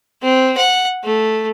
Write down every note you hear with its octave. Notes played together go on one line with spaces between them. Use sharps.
C4
F#5
A3